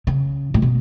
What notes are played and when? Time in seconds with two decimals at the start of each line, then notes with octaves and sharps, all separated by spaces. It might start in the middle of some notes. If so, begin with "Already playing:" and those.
0.07 C#3
0.54 A2
0.62 B2